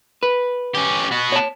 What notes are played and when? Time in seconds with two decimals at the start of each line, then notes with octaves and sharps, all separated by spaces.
0.23 B4
0.74 C#4 G4
1.11 B3 F#4
1.32 C#5 A5